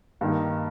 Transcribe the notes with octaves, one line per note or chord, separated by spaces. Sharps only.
G2 D#3 A#3 D#4